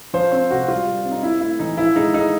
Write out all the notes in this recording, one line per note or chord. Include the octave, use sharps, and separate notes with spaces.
F3 C5
C4 C5
C3 F#4
G3 F4
G3
C4
D#4
C4 E4
A3 E4
E3 D#4
F3 E4
G#3 D#4
G#3 D#4